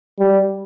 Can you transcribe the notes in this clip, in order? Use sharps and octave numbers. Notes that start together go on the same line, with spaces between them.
G3